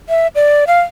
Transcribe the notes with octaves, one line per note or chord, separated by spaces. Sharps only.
E5
D5
F5